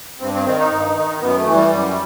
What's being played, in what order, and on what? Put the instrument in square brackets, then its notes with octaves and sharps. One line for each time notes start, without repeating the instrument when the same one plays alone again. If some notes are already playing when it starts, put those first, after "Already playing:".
[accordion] G2 C4
C4
D#3 C4
D#4
G2
D#3
F#2 B3
A3
E3
G3
F#2